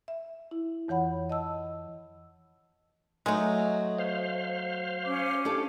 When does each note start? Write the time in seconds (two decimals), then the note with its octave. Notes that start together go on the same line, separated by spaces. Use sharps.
0.08 E5
0.51 E4
0.88 F2 E3 C#5 F#5 B5
1.30 D#5 A5 E6
3.26 F#3 G#3 A3 D#4
3.99 C5 F5
5.05 C#4 D6
5.45 D4 G4 A4